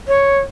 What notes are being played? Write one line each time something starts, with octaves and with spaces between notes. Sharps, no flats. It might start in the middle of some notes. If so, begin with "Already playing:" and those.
C#5